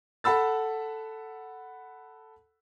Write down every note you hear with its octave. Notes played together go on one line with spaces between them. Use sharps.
A4 F#5 B5 E6 A6